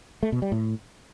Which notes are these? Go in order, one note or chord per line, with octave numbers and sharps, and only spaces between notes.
A3
B2
G3
A2